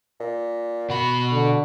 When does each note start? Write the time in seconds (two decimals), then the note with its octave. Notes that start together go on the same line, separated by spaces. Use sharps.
0.20 A#2
0.90 B2 F#4 B5
1.32 D3